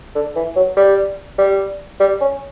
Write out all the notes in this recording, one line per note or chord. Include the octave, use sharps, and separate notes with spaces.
D3
E3
F#3
G3
G3
G3
C#4